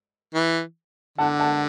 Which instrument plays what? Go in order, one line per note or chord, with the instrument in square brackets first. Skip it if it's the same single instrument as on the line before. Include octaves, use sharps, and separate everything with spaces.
[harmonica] E3
[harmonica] D3 [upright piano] F#5 A5
[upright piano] F#5 A5